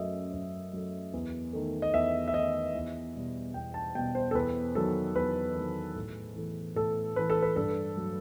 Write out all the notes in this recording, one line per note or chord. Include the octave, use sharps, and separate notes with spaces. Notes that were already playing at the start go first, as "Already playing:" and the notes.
Already playing: F#2 F#3 A3 D#5 E5
F#2
F#3 A3
E2
D#3 A3
D#5
E2 E5
E5
D#3 A3 D#5
E2
B2 G3
E2 G5
A5
B2 G3 G5
C5
A4
E2 B4
D#3 F#3 A4
E2 B4
D#3 F#3
A2
E3 A3
A2 A4
E3 A3 B4
A4
B4
G2 A4
F#3 A3